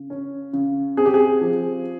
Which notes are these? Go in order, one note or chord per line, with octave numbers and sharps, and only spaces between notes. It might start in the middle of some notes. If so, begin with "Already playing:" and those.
Already playing: C#3
C#4
C#3
C4 G#4
G4
G#4
F3